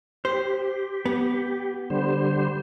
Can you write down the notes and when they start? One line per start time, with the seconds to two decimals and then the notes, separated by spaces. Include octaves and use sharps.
0.25 G4 C5
1.05 B3
1.90 D3 G3 C5